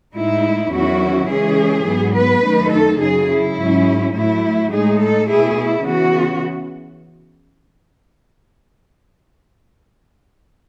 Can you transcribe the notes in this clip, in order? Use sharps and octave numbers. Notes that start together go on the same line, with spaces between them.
A2 G#3 D#4 E4
E2 D#3 F#3 C#4 E4 F#4
C#3 E3 G#3 C#4 G#4
G#2 F#3 B3
B4
F#2 D#3 A3 D#4
A4
F#2 C#3 F#3 G#4
E4
G#2 F#3 C#4
A2 F#3 A3 E4
A2 G#3 D#4 G#4
A4
B2 A3 E4 G#4
E4
C#3 E3 B3 F#4